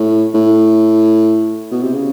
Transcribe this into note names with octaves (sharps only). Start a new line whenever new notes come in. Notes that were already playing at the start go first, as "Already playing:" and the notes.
Already playing: A2
A2
B2
C3
C#3